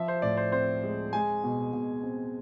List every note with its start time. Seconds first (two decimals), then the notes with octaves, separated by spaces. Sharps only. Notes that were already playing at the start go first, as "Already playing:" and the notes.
Already playing: F3 E5
0.08 C5
0.22 A2 D5
0.37 C5
0.52 C4 C5
0.84 G#3
1.13 G#3 G#5
1.44 B2
1.73 B2
2.03 C4